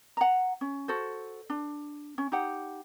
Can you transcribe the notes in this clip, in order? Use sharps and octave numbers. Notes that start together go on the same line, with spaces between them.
F#5 A#5
C#4
F#4 A4 C5
D4
C#4
D#4 G4 F#5